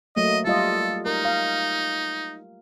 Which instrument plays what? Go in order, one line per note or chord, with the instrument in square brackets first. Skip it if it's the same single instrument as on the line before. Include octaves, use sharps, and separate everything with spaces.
[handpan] F#3 A3 A#3 [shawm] D#5
[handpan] G3 F4 D#5 [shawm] A4
[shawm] D#4 [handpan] A#4
[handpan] F5